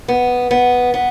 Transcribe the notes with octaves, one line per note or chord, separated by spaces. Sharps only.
B3
B3
B3